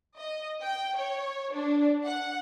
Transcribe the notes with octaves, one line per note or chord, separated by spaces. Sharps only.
D#5
G5
C#5
D4
F#5